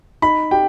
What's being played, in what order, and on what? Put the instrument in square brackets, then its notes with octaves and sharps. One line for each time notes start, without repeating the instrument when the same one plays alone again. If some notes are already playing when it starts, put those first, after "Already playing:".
[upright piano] D#4 [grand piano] B5
[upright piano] G4 [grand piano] G5